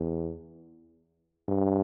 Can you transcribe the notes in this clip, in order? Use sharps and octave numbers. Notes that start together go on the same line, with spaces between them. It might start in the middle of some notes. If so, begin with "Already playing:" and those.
Already playing: E2
G2